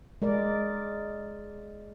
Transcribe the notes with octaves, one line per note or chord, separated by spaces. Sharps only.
G#3 A#4 D5